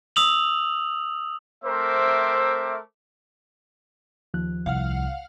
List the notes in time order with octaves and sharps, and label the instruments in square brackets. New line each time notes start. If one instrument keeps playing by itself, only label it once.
[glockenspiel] D#6 E6 F7 F#7
[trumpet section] A3 C4 A#4 C5 E5 D6
[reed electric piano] D#2 F3 F#6
[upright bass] C2 [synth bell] F5 F#5 F6